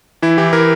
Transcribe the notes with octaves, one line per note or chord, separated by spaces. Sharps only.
E3 E4
E3 G4
E3 A#4